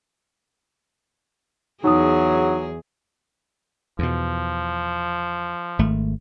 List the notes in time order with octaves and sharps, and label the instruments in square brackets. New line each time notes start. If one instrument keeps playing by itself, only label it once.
[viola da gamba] E2 G#4 [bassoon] F#3 [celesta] D#4 D#6
[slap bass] E2 B2 [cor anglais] F3
[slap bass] G#1 A3